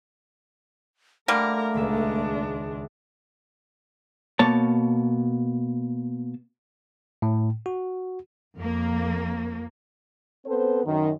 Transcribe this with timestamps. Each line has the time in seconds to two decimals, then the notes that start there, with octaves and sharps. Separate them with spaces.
1.28 D3 G3 A3 A#3 A#4
1.74 D#1 C#2 G#3 D4 E5
4.39 B2 A#3 C#5 A5
7.22 A2
7.66 F#4
8.57 F2 A#3
10.46 B3 C4 A4 B4 C5
10.85 F#2 D#3